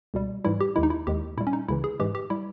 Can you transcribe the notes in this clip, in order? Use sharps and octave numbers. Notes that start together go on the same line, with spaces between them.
C#2 B2 G3
G#2 E3 G3 E4
G4
D#2 D#3 G#3 E4
D#4
E4
D#2 D#3 G#3 G4
A#2 G3 E4
C#4
D#4
C#2 C#3 E3 E4
G#4
G#2 E3 G#3 G4
G4
G3 E4